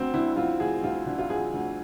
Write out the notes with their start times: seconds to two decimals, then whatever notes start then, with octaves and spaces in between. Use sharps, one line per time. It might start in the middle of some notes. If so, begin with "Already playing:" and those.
Already playing: D2 C4
0.13 D3 E4
0.37 F3 F4
0.60 D2 G#4
0.83 D2 F4
1.06 D3
1.18 F4
1.30 F3 G#4
1.54 D2